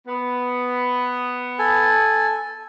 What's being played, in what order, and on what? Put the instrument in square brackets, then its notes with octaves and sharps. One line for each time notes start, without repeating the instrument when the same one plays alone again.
[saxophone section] B3
[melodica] A4 G#5